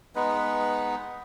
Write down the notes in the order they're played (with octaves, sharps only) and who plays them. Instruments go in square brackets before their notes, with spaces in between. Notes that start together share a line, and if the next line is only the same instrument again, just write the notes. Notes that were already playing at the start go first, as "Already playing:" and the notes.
[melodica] G#3 B3 D#4 B4